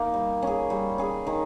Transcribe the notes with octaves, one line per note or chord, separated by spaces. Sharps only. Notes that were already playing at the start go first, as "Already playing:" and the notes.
Already playing: A#3 D#4
G3
C#4 G#4
G3
C#4 G#4
D#3